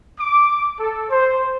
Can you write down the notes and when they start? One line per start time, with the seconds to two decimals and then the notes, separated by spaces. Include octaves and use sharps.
0.20 D6
0.79 A4
1.10 C5